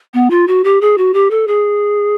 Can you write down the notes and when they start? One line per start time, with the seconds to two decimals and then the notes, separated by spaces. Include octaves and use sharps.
0.14 B3
0.30 F4
0.48 F#4
0.64 G4
0.81 G#4
0.98 F#4
1.14 G4
1.31 A4
1.47 G#4